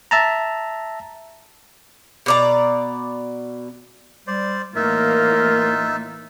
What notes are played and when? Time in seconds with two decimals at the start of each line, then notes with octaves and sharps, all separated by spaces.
0.11 E5 A5 A#5
2.26 B2 D5 A#5
4.27 G3 C5 D5
4.76 A2 E3 A#3 D#4 F4 A#4 E5